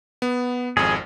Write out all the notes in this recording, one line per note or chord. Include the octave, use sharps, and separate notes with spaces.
B3
G#1 F2 G#4